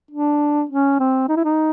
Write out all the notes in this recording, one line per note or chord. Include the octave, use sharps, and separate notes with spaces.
D4
C#4
C4
D#4
E4
D#4